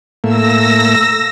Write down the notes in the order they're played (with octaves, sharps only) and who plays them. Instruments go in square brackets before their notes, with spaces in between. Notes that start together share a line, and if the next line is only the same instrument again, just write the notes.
[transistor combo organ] A2 A3 A#3 [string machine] E6 A#6